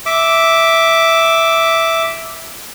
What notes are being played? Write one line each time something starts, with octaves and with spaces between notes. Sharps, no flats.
E5 D6